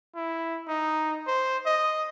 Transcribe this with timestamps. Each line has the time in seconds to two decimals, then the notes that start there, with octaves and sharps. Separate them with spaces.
0.15 E4
0.68 D#4
1.27 C5
1.66 D#5